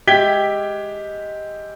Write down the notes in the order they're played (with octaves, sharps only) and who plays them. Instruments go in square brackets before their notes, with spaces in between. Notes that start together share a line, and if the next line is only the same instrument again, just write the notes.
[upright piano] G#3 G4 E5 G#6 B6 G7